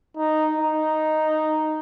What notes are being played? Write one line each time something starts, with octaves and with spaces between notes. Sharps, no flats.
D#4
D#4